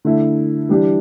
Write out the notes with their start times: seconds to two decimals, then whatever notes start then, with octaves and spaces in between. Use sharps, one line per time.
0.05 D3 A3 E4
0.69 E3 G3 D4 G4